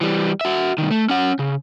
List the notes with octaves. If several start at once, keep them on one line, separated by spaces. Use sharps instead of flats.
E3 G3
F#4 E5
C2 D#3
A3
C#4 F#5
C#3